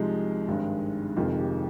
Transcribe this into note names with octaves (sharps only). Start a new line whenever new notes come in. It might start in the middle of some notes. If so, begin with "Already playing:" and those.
Already playing: C2 C3 F3 G#3 D#4
G#1 G2 D#3 G#3
F1 F2 D#3 G#3 F4
G4